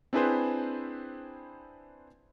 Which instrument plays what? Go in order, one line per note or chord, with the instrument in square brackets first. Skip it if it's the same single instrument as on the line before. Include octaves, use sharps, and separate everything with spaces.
[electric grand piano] C4 D4 E4 G#4 B4 C5